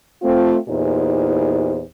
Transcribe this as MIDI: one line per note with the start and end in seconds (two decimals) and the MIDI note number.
0.22 0.56 57
0.22 0.56 60
0.22 0.56 65
0.68 1.82 40
0.68 1.82 46
0.68 1.82 63
0.68 1.82 64
0.68 1.82 67
0.68 1.82 72